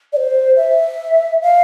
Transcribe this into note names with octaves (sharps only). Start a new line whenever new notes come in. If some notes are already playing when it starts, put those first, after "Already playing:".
D5
C5
E5
F5